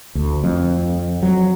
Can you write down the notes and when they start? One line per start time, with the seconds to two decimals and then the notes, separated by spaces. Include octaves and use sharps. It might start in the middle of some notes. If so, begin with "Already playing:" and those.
0.15 D2
0.44 F2
1.23 F#3